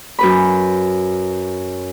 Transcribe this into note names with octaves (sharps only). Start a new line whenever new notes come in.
F#2 B4 B5